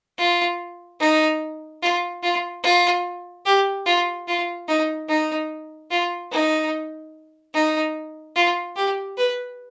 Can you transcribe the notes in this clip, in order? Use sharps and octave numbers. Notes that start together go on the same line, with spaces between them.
F4
D#4
F4
F4
F4
G4
F4
F4
D#4
D#4
F4
D#4
D#4
F4
G4
B4